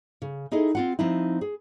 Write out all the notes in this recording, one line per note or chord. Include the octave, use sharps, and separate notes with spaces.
C#3
D#4 E4 G#4 A4 D#5
C4 F4 F#5
F3 C4 D#4 E4
G#4